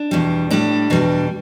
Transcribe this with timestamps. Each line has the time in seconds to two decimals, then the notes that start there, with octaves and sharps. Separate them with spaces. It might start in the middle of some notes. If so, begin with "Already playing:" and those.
Already playing: D4
0.11 E2 B2 G3
0.51 A2 G3 D4
0.90 E2 B2 G3